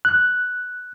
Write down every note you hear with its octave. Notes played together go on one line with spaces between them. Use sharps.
F#6